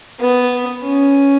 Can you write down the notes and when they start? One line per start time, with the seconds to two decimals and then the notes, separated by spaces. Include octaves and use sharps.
0.20 B3
0.84 C#4